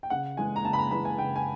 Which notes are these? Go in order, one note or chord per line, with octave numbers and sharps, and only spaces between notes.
G5
C#3 F#5
E3 G#3 G#5
A#5
C#3 A5
B5
A#5
E3 G#3 B5
G#5
C#3 G5
G#5